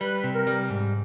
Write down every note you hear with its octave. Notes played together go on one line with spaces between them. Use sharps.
G3 B4
C3
A#4
G3
G#2